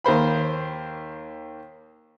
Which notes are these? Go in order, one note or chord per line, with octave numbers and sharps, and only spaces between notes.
D#2 A#3 C5 B5